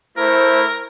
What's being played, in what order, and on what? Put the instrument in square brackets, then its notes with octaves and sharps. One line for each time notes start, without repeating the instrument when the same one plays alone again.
[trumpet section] A3 E4 [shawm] A#4 [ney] C5